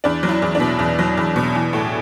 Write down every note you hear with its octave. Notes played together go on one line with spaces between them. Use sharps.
E2 D4
F#3
E4
E2
D4
B2
E2
F#3
E2
B2
E3
A2